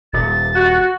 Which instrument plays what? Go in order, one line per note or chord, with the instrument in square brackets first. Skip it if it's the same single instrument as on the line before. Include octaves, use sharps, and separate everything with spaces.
[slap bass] D#1 [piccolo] A6
[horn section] F#4